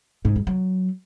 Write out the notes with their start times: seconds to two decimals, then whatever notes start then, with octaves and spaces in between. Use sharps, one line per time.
0.25 G#2
0.36 G2
0.47 F#3